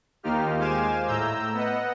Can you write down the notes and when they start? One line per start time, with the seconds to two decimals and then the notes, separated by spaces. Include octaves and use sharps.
0.23 D#2 A#3 D#4 F4 G4 F6
0.58 G#3 C5 F5 G#5 D6 E7
1.06 A2 A#5 E6 G6
1.54 B3 D#5 F#5